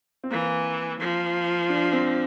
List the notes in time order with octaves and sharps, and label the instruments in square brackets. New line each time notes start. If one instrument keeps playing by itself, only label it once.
[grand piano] C4
[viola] E3 [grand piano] A#3
[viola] F3
[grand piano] D4
C4